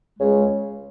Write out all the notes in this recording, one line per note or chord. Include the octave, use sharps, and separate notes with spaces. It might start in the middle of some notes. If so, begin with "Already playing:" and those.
C#2 C#3 G#3